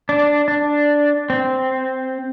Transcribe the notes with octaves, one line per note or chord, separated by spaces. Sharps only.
D4
D4
C4